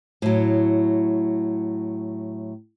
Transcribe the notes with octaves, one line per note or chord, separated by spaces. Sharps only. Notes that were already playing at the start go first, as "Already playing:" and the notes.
A2 F#3